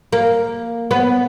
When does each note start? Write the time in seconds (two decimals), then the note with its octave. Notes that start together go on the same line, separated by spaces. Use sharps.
0.13 A#3
0.91 B3